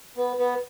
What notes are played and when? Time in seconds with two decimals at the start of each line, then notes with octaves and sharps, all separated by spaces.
0.17 B3
0.38 B3